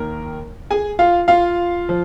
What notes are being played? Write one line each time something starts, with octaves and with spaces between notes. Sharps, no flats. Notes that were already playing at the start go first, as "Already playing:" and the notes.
Already playing: D#2 D#3 A#3 A#4
G#4 G#5
F4 F5
F4 F5
F3